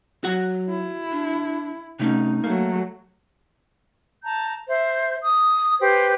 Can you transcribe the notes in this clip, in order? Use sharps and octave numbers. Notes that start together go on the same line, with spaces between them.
F#3 F#4 F#5
E4
D4
C3 A3 C#4 D#4
F#3 A3 A#3
A5 A#5 G6
C5 E5
D#6
G4 B4 C5